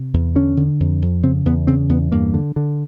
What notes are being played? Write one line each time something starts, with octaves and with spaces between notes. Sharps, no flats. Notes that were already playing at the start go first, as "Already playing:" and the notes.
Already playing: C3
E2
D3 C#4
D3
F2
F2
C#3 C4
E2 B3
C#3 C4
E2 B3
G2 A#3
D3
D3